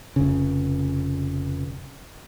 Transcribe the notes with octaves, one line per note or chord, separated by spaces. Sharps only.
F1 C#3